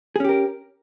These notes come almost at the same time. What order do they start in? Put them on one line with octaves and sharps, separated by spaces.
G#4 C#4 G4 A#4